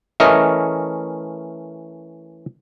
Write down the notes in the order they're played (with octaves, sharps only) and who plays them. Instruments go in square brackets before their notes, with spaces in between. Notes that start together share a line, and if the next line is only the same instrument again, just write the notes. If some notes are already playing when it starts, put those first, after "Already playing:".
[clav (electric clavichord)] E3 A3 C#4 A#4 D#5